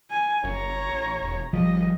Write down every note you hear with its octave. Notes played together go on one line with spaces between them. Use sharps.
G#5
F#1 C#5 A#5
A1
E1
G#1 F3 G3 D#5